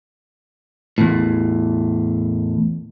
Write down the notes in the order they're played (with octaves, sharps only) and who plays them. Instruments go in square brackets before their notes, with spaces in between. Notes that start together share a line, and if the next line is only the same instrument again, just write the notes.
[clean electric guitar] E2 A2